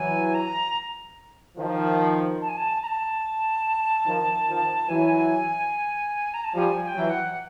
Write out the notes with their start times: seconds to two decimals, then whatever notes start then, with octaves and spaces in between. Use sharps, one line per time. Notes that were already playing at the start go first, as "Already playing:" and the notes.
Already playing: E3 F#3 G#5
0.34 A#5
1.57 D#3 F3
2.41 A5
2.49 G#5
2.57 A5
2.83 A#5
2.87 A5
4.06 D#3 F3
4.48 D#3 F3
4.89 E3 F#3 G#5
6.34 A#5
6.44 A5
6.54 F3 G3 G#5 A5
6.83 G#5
6.87 G5
6.95 E3 F#3
7.10 F#5